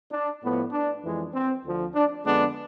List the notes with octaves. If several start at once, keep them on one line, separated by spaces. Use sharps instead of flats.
D4
A2 F3 B3
D4
F2 E3 G#3
C4
D2 D3 F3
D4
F2 D3 G#3 B3 D4